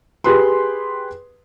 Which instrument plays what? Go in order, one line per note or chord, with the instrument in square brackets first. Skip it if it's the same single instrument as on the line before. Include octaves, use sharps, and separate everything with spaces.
[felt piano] G4 G#4 B4 C6